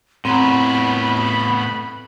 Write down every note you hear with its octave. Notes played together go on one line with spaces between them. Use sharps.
A2 B3 C4 A#5 B5